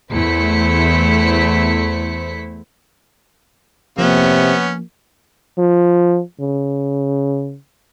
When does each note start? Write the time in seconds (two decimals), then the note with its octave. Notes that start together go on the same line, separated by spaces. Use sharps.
0.11 E2 A3 E4 C5 B6 C#7
3.98 C3 F3 A#3 B3 C#4
5.59 F3
6.40 C#3